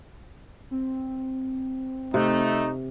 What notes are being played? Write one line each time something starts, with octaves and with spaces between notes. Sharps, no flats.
C4
C3 A3 D#4